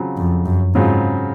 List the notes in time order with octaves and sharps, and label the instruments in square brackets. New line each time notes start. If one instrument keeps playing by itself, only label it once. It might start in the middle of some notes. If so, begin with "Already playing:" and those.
Already playing: [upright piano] C#3 F#3 C4 F4
[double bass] F2
F#2
[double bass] G#2 [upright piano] C#3 F#3 C4 F4